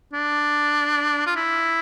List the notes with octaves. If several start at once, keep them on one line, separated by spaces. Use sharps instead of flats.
D4
F4
E4